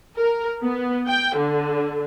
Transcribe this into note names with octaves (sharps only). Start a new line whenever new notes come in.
A#4
B3
G5
D3